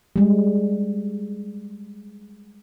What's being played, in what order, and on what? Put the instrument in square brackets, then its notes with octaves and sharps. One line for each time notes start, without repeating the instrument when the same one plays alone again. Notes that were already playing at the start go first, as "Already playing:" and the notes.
[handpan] G3 G#3